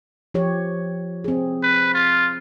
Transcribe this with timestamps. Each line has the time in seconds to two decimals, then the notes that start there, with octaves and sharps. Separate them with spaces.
0.34 F3 G4 C#5
1.24 C4 G#4
1.63 B4
1.94 F4